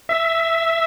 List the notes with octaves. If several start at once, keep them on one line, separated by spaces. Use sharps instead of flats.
E5